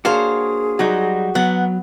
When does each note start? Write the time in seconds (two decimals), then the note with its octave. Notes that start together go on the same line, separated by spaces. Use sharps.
0.05 A#3 D4 F#4 G#4 C5 C#5 F5
0.79 F#3 G3 D#4 F#4
1.35 F#3 B3 F#5